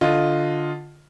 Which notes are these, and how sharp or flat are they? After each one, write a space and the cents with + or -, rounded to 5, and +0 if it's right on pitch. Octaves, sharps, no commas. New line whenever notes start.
D3 +0 F4 +5 D#5 +0